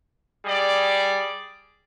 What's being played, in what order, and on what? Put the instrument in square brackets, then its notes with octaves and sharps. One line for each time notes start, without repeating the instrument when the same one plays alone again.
[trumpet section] G3 G#4 D5